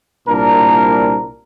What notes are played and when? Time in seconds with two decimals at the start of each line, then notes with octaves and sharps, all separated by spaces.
0.28 C2 A#2 D4 A#4